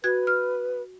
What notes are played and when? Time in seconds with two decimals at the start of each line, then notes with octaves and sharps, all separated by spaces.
0.04 F#4 B4 G#6
0.27 F6